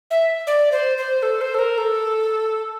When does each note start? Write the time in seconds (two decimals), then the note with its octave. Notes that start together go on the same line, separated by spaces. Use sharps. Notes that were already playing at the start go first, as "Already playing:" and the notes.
0.11 E5
0.47 D5
0.72 C5
0.98 C5
1.23 A4
1.41 C5
1.54 A4
1.59 A#4
1.78 A4